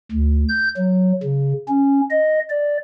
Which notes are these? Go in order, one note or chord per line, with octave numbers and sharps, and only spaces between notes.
D2
G6
F#3
C#3
C#4
D#5
D5